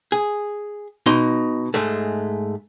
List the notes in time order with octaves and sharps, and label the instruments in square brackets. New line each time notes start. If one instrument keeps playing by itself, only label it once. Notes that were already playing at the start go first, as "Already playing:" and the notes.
[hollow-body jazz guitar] G#4
B2 D#4 C6
G#2 G#3 A3